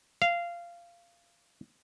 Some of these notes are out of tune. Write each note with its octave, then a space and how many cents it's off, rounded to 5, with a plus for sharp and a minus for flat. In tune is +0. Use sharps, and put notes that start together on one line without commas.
F5 -15